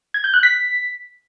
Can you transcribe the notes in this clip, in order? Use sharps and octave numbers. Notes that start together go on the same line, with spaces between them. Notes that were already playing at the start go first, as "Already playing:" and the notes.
G#6
G6
F#6
B6